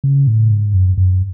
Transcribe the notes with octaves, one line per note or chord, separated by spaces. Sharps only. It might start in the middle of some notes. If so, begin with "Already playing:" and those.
C#3
A2
G#2
F#2
F#2